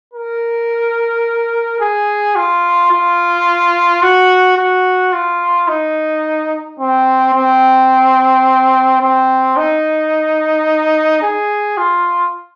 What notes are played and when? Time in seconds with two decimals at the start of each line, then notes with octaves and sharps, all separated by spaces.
0.14 A#4
1.80 G#4
2.36 F4
2.92 F4
4.02 F#4
4.58 F#4
5.13 F4
5.68 D#4
6.80 C4
7.34 C4
9.01 C4
9.57 D#4
11.22 G#4
11.78 F4